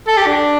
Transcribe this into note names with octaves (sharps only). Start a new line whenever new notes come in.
A4
G4
D4